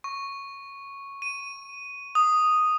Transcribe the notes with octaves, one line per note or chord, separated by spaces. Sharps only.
C#6
D#7
D#6